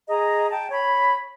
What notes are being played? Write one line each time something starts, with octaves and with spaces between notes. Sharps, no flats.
G#4 D#5 A#5
G5 A5
C#5 B5